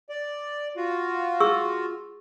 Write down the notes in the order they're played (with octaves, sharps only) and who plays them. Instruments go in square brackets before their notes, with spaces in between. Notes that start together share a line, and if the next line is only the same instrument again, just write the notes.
[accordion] D5
F4 F#4
[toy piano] G#4 C#6 E6